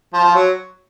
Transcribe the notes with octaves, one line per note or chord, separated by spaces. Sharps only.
F3
F3
F#3